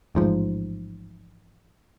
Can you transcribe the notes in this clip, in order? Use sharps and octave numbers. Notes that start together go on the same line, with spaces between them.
A1 G#2 F3